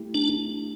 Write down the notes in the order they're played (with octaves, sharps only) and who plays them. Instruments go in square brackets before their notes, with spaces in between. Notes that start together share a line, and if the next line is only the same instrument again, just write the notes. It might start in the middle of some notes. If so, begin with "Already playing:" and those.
Already playing: [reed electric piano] A3 E4 G4
[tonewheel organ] D4